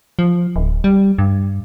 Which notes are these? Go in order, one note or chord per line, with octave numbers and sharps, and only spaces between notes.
F3
D1
G3
G2